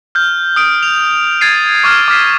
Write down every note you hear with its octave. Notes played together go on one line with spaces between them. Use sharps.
F6 G6
D#6 D7
F7
G#6 A6 C7 D#7
C#6 D6 F6 G#6
D6 F6 B6 C7